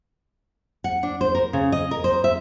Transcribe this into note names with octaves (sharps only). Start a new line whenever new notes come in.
F#5
D4
C5
A#4
C#3
D#5
A#4
C5
E5